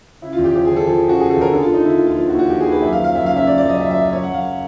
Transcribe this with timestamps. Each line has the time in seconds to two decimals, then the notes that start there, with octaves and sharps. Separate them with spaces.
0.22 C#3 E4
0.33 F4
0.38 E2
0.44 G4
0.55 F3 G4
0.65 G#4
0.71 F3
0.76 A4
0.87 F3 G#4
1.03 C#3
1.09 F#4
1.20 C#3 G#4
1.30 A4
1.36 E2 A#4
1.52 D3 A4
1.63 F4
1.69 D3 D#4
1.84 D3 E4
1.95 F4
2.01 D#2
2.07 F4
2.17 F3 F4
2.29 F#4
2.33 D#2
2.39 F#4
2.49 F3 G4
2.60 G#4
2.66 D#2 B4
2.82 F#2 E5
2.93 F5
2.98 F3
3.04 F5
3.15 F#2 E5
3.26 C#3 F5
3.36 E5
3.47 F#2 D5
3.58 D5
3.63 F#2
3.69 D#5
3.80 F#2 E5
3.91 E5
3.96 C#3
4.02 E5
4.12 F#2 C#5
4.23 F#5
4.29 F#2
4.34 F5